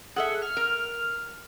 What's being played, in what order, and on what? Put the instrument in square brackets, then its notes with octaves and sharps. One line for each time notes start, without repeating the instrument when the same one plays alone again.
[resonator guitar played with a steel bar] G#4 A4 E5 [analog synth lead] F#5
[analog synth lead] F6
[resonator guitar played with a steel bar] A#4